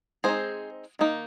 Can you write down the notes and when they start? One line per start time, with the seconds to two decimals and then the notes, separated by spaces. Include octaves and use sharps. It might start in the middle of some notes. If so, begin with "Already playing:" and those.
0.24 G#3 C4 D#4 G#4 C5
0.99 D#3 A#3 D#4